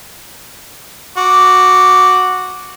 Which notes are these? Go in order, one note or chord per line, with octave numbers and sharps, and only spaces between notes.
F#4 D6